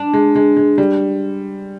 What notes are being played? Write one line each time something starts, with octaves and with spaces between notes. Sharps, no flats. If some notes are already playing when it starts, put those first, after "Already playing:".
Already playing: D4
G#3
G#3
G#3
G3